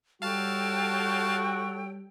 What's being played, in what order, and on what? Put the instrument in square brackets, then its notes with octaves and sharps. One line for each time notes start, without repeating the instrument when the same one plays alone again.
[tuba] G3 [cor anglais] F#4 [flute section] A4 C#5 G5 [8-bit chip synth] F5 A5